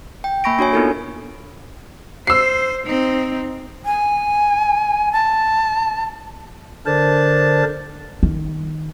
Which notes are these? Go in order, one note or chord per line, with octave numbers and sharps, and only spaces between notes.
G5
A#3 G#5 B5 C#6 A#6 D7
D4 F#4 C#5 G#5
B3 D4 D#4 F4 A4 A#4
C5 E6 C7
C4 D#4
G#5
A5
D3 D4 A#4 C5 A5
D#3